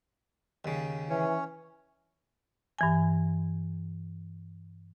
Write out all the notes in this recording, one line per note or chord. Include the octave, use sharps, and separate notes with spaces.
D#2 C#3
E3 C#4 C#5
G2 E3 G#5